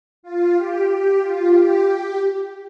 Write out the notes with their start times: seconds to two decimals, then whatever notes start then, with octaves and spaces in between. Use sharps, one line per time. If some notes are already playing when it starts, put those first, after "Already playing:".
0.23 F4
0.55 G4
0.87 G4
1.19 F4
1.51 G4